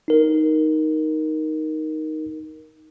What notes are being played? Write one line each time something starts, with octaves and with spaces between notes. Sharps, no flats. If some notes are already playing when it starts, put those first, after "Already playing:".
D#4 A#4